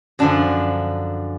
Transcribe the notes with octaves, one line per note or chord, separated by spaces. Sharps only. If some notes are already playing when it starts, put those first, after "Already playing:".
F#2 D3 F3 D4